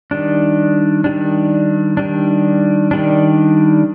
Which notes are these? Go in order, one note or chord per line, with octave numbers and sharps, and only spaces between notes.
D#3 G3 D4
D#3 G3 D4
D#3 G3 D4
D#3 G3 D4